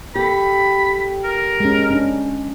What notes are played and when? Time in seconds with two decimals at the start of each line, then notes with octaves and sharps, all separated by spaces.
0.15 G4 A4 B5
1.24 A#4
1.60 G#3 C#4
1.90 C#4 D4